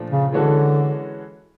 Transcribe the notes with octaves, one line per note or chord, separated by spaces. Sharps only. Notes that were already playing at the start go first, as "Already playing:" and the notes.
Already playing: A#2 F3 A3 D4
C#3
D3 E3 G#3 C#4 F#4 A4